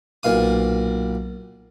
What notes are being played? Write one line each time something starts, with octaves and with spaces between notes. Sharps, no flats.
B1 A#2 F5 D#6